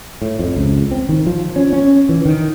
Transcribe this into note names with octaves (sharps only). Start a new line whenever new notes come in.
A2
F2
C#2
C4
D#3
F3
C#4
C#4
E3
D#3